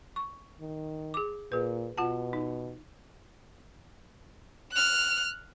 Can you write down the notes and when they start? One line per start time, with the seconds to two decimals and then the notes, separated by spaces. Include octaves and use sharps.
0.16 C#6
0.60 D#3
1.14 G#4 D6
1.52 A#2 G#4 B4
1.98 B2 F4 F#5 A5
2.33 D#4
4.73 F6 F#6